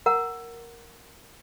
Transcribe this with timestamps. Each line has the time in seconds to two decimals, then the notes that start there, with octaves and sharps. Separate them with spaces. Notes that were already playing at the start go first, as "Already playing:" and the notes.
0.06 A#4 F#5 A#5